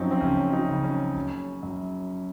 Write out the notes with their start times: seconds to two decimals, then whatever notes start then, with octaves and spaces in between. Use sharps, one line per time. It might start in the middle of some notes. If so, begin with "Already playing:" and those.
Already playing: F#2 F3 C4 C#4 D#4
0.11 C4
0.21 F#1 C#4
0.53 D#4
0.69 C#3
0.84 C#4
1.15 F#1
1.63 F#2